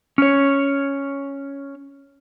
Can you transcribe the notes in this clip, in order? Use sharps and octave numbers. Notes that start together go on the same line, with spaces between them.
C#4 C#5